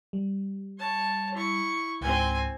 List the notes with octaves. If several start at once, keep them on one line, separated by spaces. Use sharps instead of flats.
G3
C#5 A5
E4 C#6
C#2 G#2 C4 G#5